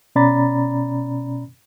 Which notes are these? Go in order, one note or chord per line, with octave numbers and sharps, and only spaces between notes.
B2 C#4 D5 A#5 B5 A6